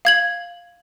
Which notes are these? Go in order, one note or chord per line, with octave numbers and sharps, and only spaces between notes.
F5 G#6 F#7